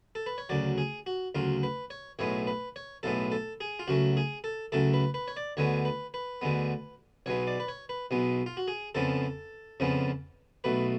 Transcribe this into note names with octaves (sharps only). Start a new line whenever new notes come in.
A4
B4
C#5
D2 C#3 F#3 D5
G#4
F#4
D2 C#3 F#3 F4
B4
C#5
B1 A2 G#3 B3 C#5
B4
C#5
B1 A2 G#3 B3 A4
A4
G#4
F4
C#2 C#3 F#3 A3 F#4
G#4
A4
C#2 C#3 F#3 A3 A4
B4
B4
C#5
D5
D2 D3 G#3 B3 C#5
B4
B4
D2 D3 G#3 B3
B1 B2 G#3 B3 C#5
D5
B4
C#5
B4
B1 B2 G#3 B3
F4
F#4
G#4
F2 C#3 F3 G#3 B3 A4
F2 C#3 F3 G#3 B3
B1 B2 A3 B4